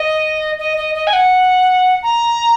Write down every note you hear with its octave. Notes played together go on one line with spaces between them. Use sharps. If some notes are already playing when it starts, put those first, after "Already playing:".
Already playing: D#5
D#5
D#5
D#5
G#5
F#5
A#5